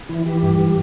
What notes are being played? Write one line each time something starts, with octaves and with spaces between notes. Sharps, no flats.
E3 E4
E3 G4
G2
E3